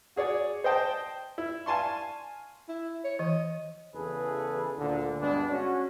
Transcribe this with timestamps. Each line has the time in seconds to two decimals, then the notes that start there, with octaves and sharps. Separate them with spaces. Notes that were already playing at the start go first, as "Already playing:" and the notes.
0.16 F#4 G#4 C#5 D5
0.64 C5 D#5 G5 A5
1.38 E4
1.66 F5 G#5 A5 C6 C#6
2.69 E4
3.04 C#5
3.19 E3 D#5
3.94 E2 C#3 E3 G#4 A4 B4
4.78 D2 A#2 D3
5.20 D2 G2 G#3 B3 D4
5.51 C#4 F#4